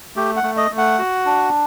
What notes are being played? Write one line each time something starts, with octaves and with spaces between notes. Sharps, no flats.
A3 G4
F#5
A3
D#5
A3
F#5
F#4
D4